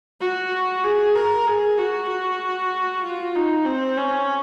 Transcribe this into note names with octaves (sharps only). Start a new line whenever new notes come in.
F#4
G#4
A#4
G#4
F#4
F#4
F4
D#4
C4
C#4